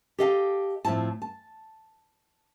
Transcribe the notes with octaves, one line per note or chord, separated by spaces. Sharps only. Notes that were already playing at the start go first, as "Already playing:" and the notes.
G4 A4 D#5 F5 F#5 A5
A2 F3 C4 E4 A5
A5